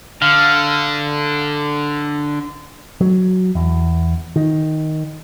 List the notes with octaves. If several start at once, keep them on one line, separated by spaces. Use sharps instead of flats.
D3 F5
F#3
E2
D#3